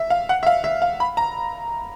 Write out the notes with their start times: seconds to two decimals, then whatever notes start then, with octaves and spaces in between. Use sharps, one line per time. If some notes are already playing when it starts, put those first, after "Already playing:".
Already playing: E5
0.10 F5
0.29 F#5
0.43 E5
0.47 F5
0.64 E5
0.82 F5
1.00 B5
1.17 A#5